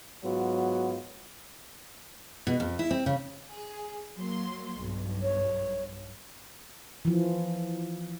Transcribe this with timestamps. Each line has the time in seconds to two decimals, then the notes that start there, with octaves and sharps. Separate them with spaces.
0.23 G#2 F#3 B3 F4 F#4
2.47 B2
2.60 F2
2.79 E4
2.91 C4
3.06 C#3
3.51 G#4
4.18 F#3 A#3 C6
4.79 B1 G2
5.22 C#5
7.05 E3 F3